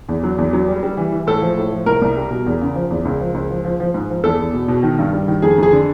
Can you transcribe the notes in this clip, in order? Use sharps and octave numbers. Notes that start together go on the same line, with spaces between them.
E2
F#3
E2
F#3
G3
G3
E3
E3
A2 A4
F3
A2
F3
C2 A#4
C2
G3
B2
E2
C#3
F3
E2
C#2
F3
C#2
F3
F3
F3
G#2
F3
E2 A4
E2
B2
B2
D#3
G2
G3
D#3
F2 G#4
F2 G#4
D3